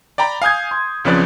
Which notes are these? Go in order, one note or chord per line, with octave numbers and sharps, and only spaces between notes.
D5 G5 A#5 B5
F5 G#5 D#6 G6 G#6
C6
B1 C#3 F3 C4 B4 D5